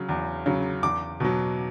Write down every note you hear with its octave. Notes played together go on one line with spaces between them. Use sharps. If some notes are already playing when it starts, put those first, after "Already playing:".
Already playing: C#3 F#3
E2
C#3 F#3
E2 D6
B2 F#3